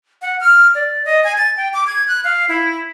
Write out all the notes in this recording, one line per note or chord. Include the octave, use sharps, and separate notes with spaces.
F#5
F6
D5
D#5
G#5
A6
G5
D6
G#6
F#6
F5
E4